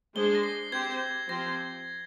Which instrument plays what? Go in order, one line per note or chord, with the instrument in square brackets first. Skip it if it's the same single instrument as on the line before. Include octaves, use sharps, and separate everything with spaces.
[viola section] G#3 D4 G#4 C5 [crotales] G7
[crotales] A#6
C7
[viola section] C4 G4 C5 [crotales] G#6
[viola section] F3 C4 G4 C5 [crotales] A#6